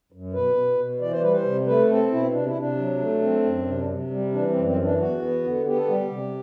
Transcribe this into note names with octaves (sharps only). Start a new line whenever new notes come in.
F#2
B2 B4
B2
B2
E3 D5
C5
G3 B4
C5
C3
A3 B4
C4 A4
B2 E4
C3 D4
E4
C3 D4
F#3
A3
C4
F#2
C3
C3
G3
E3 D4
C4
F#2
C4
E3
D4
E2 F#4
B3
D3
B3 G4
A4
G3 G4
C3